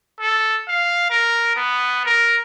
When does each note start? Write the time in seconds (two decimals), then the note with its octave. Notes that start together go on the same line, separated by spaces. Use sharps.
0.20 A4
0.68 F5
1.10 A#4
1.56 B3
2.05 A#4